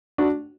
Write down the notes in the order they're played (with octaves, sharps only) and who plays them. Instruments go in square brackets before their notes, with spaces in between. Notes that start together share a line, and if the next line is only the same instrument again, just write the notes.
[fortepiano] D4 F#4